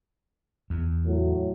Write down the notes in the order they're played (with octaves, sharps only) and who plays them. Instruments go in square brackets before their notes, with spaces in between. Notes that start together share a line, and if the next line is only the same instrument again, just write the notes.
[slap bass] E2
[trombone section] A2 F#3